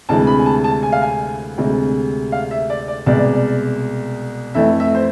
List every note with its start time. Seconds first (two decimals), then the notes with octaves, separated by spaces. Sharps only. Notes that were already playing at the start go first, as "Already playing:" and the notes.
0.09 D2 C3 E3 G#3 A5
0.27 B5
0.39 G#5
0.46 A5
0.64 A5
0.83 G#5
0.92 F5
1.02 G#5
1.58 D2 C3 G#3
2.32 F5
2.51 E5
2.70 D5
2.88 D5
3.06 C2 B2 G#3 D5
4.55 F2 E3 A3 E5
4.80 E5
4.95 C5